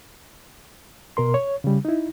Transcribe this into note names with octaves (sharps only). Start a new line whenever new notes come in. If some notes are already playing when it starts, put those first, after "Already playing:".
B2 A#4 C6
C#5
C#3 G3
D#4 E4